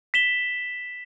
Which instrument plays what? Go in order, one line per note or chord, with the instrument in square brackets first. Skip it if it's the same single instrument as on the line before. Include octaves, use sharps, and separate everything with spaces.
[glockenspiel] B6 E7 G7